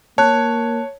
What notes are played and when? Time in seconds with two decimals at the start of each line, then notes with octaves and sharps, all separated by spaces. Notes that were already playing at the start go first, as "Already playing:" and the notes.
0.18 A#3 C#5 A5 F#6